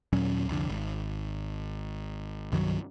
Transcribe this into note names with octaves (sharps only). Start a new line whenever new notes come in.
D#2 A#2 F#3 C#4
C2 F2 D3
G#1
C2 G2 D#3 F#3